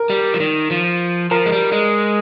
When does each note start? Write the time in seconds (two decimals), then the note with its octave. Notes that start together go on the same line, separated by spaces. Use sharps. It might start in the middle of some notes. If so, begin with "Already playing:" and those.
Already playing: A#4
0.10 G3
0.34 F3
0.40 D#3
0.71 F3
1.31 F3 A#4
1.46 G#3
1.52 G3
1.72 G#3